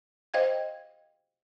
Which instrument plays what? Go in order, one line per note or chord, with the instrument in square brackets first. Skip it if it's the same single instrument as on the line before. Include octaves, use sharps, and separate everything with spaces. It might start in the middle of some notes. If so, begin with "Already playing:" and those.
[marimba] C5 D#5 F5 G5 G#6